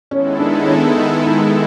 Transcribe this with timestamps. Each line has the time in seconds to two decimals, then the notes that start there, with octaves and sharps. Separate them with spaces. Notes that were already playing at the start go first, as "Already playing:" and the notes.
0.11 D#3 G#3 B3 C#4 E4 A4
0.40 D4
0.63 C#4
0.68 D4
0.97 D#4
1.27 D#4